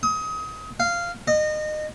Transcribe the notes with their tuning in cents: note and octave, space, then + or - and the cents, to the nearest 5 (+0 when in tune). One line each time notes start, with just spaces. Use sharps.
D#6 +30
F5 -10
D#5 -25